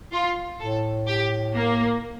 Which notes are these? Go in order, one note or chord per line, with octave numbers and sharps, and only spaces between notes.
F4
A2 A4
G4
A#3